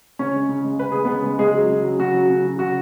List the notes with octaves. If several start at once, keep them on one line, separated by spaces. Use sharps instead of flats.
C#3 C#4 C#5
G#3
C#3
G#3
C#3 B4
G#3 G#4
C#3 B3 B4
G#3
C#3 G#3 G#4
F#3
C#3
F#3
C#3 F#4
F#3
C#3
F#3
C#3 F#4